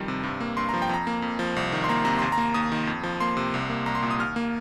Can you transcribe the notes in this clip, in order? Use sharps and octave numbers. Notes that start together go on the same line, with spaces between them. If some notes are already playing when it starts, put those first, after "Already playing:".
Already playing: F2 D#3 F3 G3
C3
G2
A#3
G2 C6
F3 A#5
G5
F2 A#5
A#3
F2
F3
C2
D#3
C6
A#3 A#5
C3 A#5
D#2 C6
A#5
A#3
D#2 D#6
D#3
F2
F3
A#3 C6
C3
C2
A#3
C2 A#5
C6
A#2
D#6
D#2 F6
A#3